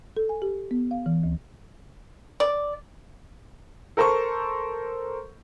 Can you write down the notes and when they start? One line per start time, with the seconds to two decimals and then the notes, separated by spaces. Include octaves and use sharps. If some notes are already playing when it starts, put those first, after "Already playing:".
0.17 A4
0.29 G#5
0.42 G4
0.71 B3
0.91 F5
1.06 E3
1.23 D2
2.40 D5
3.97 A4 A#4 C5 A5 C#6